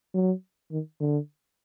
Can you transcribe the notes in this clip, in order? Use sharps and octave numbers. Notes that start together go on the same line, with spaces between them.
F#3
D#3
D3